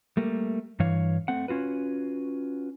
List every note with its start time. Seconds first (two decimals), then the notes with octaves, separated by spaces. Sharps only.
0.17 G3 A3 A#3
0.80 G2 E3 C#5 F5
1.28 A3 C4 F#5
1.48 C#4 F4 F#4 B4